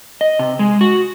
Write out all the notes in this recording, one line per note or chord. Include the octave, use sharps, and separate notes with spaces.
D#5
C3
G#3
F#4